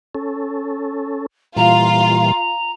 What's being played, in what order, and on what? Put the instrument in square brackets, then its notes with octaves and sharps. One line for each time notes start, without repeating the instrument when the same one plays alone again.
[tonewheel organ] C#4 A4
[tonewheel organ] A#2 E3 G3 [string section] F4 [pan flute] A#5